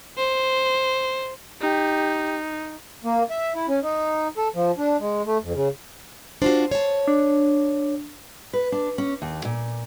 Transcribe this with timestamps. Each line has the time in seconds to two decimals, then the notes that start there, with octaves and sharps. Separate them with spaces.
0.18 C5
1.61 D#4 G4
3.04 A#3
3.31 E5
3.55 E4
3.68 C#4
3.83 D#4
4.37 A4
4.55 F3
4.78 D4
5.00 G#3
5.26 A3
5.43 F2
5.54 C#3
6.42 D4 F4 F#4 C5
6.71 C#5 A5
7.07 D4
8.53 B4
8.72 D4
8.98 C#4
9.22 D#2
9.45 A#2